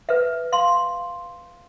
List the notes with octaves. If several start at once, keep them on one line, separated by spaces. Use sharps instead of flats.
B4 E5
F5 C6